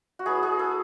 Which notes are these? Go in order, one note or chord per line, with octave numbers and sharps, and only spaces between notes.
F#4
F#3 B3 E4 G#4
G#4
A4